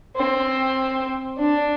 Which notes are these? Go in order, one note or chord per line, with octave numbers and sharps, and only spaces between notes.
C4
D4